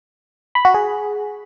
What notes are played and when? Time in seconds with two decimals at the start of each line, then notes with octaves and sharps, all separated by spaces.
0.55 B5
0.65 F#4
0.74 G#4